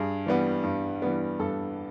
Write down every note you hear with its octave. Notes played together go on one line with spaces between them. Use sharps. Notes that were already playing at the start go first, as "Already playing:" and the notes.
Already playing: G2 G#4
E3 G3 B3
G2
E3 G3 B3
G2 A4